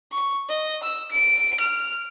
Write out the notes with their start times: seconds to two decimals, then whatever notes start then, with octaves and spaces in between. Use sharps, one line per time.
0.12 C#6
0.49 D#5
0.83 E6
1.11 D7
1.60 F6